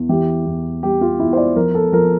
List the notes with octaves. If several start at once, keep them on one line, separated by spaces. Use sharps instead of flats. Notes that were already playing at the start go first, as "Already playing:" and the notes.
Already playing: E2
E3 G4
E2
G3 G4
F4
E2 E4
C5
D5
F3 A#4
A4
F3 A#4